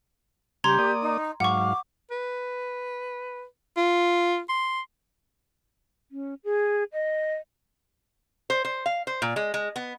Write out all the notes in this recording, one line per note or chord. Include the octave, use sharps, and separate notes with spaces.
C#3 G3 G4 A#5 C6 G#6
A#3 D5 D#6
D#4
G#2 F#3 F5 F#5 C#6 D6
B4
F4
C6
C#4
G#4
D#5
C5
C5
F5
C5
A#2
G#3
G#3
B3